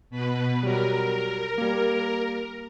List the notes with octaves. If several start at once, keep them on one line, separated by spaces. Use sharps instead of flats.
B2 B4
F#3 G3 A#4
G3 A#3